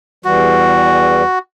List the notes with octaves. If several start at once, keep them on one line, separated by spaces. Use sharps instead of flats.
E2 E3 G3 F#4